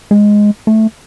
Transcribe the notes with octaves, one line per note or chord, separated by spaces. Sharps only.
G#3
A3